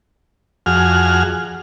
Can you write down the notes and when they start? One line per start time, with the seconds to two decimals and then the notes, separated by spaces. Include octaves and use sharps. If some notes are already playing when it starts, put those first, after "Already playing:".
0.66 F2 F#4 G#4 F6